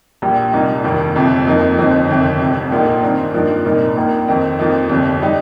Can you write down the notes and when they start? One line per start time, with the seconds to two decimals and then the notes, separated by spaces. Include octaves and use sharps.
0.22 A#1 A#2 G3
0.53 C2 A#2 A#3 D#4
0.85 F1 D#2 D#3
1.15 G1 F2 C3 F3
1.47 F2 F3 A#3 D#4
1.78 G1 F2 F3 C4 D#4
2.08 G1 F2 C3 D#3
2.41 F1 F2 C3
2.72 A#1 A#2 A#3 D#4
3.02 G2 D#3 C4 D#4
3.34 G2 F3 A#3 D#4
3.65 C2 A#2 A#3 D#4
3.96 A#1 A#2 A#3 D#4
4.28 F2 D#3 C4 D#4
4.59 F2 F3 A#3 D#4
4.89 G1 F2 C3 G3
5.22 G3 D#4